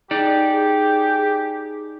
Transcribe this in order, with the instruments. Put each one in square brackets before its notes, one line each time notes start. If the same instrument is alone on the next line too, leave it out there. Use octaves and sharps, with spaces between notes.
[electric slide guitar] D#4 D5 [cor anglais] G4 [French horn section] G#4